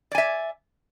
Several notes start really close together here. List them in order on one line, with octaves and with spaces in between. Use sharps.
D5 G#5 E5